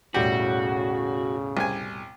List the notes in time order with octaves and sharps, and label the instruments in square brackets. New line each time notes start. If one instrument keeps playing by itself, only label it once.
[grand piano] E1 A2 G3 [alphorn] C#3 [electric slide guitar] F#4 [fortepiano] G4
[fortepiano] C2 G#5